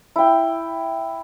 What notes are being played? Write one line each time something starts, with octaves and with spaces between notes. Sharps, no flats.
E4 G5